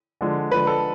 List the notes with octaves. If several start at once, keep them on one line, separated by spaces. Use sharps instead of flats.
D3 F3 G#3
D3 F3 G#3 B4
A4